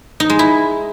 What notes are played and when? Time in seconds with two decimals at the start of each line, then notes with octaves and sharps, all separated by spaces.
0.20 D#4
0.30 G#3
0.39 E4